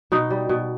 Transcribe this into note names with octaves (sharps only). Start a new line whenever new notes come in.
B2 D#4
G3
B2